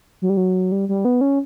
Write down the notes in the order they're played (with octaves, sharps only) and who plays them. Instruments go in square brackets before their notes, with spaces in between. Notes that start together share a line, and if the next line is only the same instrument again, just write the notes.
[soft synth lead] F#3
G3
F#3
G3
G3
B3
C#4